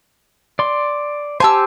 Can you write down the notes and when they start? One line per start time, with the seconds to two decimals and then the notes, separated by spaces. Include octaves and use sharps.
0.59 D5 C6
1.40 G4 C5 G#5 A5 E6